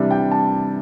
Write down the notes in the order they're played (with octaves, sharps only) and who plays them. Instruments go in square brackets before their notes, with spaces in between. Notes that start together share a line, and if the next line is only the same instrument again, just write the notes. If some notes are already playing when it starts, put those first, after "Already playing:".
Already playing: [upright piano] C3 E3 G3 D4 E5
G5
A5